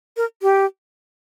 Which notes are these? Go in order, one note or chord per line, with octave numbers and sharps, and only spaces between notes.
A#4
G4